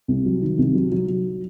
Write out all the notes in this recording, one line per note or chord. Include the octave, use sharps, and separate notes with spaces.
C2
F#3
D#3
C2
F#3
F#3
F#3